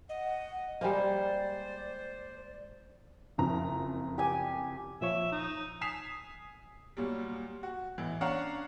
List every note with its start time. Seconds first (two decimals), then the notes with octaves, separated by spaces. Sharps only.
0.09 D#5 F#5
0.81 G3 G#3 A#3 C5 D5
3.38 F#1 F2 A#5
4.18 G4 G#5
5.01 A#2 F3 C#5 E5
5.32 D#4
5.81 G#5 D#6 B6 C7 E7 F7
6.97 A#2 F#3 G3
7.63 F#4
7.98 A1 E3
8.21 C#4 D4 C#5 F5 F#5 A#5